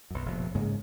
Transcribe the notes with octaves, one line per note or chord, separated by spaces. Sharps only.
B1 F#2
F1 A#1 B2
G#2 C#3 G#3 A#3